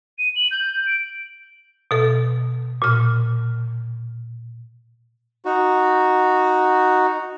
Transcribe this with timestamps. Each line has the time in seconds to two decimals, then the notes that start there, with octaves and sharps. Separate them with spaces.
0.18 D#7
0.35 F#7
0.51 G6
0.87 D7
1.91 B2 A4
2.82 A#2 F6
5.45 D#4 F#4